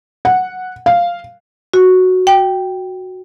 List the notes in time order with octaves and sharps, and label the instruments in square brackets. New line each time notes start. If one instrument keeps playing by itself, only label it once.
[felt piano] F#5
F5
[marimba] F#4
G5